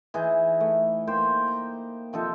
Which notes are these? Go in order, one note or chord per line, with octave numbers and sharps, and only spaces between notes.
E3 D#4 G#4
A3
A#3 C5 G5
A#5
C3 F3 D#4 A4